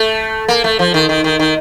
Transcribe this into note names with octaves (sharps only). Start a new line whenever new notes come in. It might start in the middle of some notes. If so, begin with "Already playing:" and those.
Already playing: A3
A#3
A3
F3
D#3
D#3
D#3
D#3